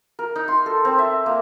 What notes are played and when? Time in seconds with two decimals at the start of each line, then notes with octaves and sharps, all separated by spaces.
0.19 A#4
0.36 D#4
0.48 C6
0.66 A4
0.85 C4
0.98 E5
1.26 A#3